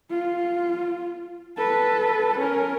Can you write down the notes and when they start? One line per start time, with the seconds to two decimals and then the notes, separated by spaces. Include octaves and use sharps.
0.10 F4
1.58 A4 B4
2.38 C#4 A#4